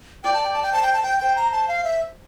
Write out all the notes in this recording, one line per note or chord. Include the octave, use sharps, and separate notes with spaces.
D5 G5
A5
G5
A5
G5
C5 A5
G5
A5
G5
C5 G5
A#5
A5
F5
E5